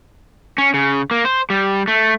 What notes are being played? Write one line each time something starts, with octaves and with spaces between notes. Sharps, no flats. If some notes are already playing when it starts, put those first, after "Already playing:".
C#4
C#3
A#3
C5
G3
A3